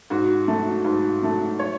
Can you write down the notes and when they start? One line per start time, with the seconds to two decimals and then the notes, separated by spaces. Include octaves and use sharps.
0.10 G#2 F#4
0.48 F#3 A3
0.85 G#2
1.23 F#3 A3
1.59 C#5